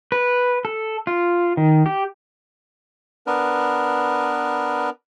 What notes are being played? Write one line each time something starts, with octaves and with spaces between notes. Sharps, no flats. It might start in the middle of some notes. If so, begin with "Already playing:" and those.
B4
A4
F4
D#3
G4
B3 D4 A#4 B4